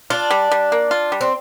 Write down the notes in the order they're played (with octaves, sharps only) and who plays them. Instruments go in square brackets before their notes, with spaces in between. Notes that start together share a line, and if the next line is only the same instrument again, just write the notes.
[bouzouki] D4 [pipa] F4
[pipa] G3
G3
A#3
F4
G3
[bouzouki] C4